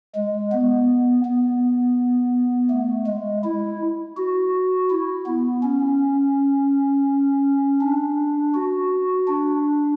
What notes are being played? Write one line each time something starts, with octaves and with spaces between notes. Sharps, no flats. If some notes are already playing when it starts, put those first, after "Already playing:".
G#3
B3
B3
A3
G#3
E4
F#4
E4
B3
C#4
D4
F#4
D4